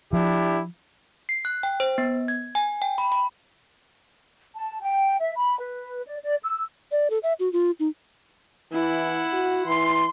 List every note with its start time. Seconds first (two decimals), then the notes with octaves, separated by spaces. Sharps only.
0.13 F3 D4 E4 G4
1.29 C7
1.45 F#6
1.63 G5
1.80 C5
1.98 B3
2.28 G#6
2.55 G#5
2.82 G5
2.98 B5
3.12 B5
4.54 A5
4.82 G5
5.20 E5
5.36 B5
5.59 B4
6.07 D5
6.23 D5
6.43 E6
6.92 D5
7.10 A4
7.23 E5
7.40 F#4
7.53 F4
7.80 D#4
8.73 E3 E4 F#5
9.33 F#4
9.66 E3 C6